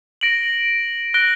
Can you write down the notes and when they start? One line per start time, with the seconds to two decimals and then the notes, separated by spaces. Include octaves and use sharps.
0.21 A#6 D7 F#7
1.14 F#6 A#6 D7 G7